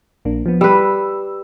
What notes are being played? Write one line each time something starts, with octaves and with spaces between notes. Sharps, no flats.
A#1 A#3 D4
F3 B3
G3 B4 E6